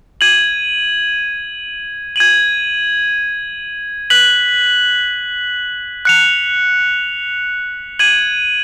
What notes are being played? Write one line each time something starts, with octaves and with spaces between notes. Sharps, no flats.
G#6 D#7 F#7
G#6 D#7 F#7
F#6 B6 F#7
F#6 C#7 F7
G#6 D#7 F#7